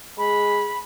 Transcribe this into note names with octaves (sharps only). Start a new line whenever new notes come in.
G#3 B5